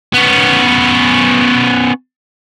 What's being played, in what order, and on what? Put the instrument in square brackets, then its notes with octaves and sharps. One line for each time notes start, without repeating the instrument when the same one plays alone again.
[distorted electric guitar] B3 C#4